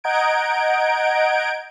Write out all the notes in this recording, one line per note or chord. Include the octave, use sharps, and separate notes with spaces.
D#5 F#5 A#5 G6 G#6 D7